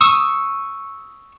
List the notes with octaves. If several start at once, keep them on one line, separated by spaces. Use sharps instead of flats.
C#6 D#6 E6